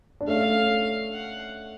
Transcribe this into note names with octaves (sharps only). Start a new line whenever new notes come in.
D4
A3 C#4 F5
F#5